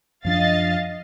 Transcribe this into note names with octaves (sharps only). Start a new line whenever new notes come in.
F#2 F3 D4 D#5 F5 A6